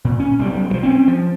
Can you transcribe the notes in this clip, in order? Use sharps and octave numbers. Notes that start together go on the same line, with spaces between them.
A#2
C#4
B1 G3
G2 F3
C4 C#4
F3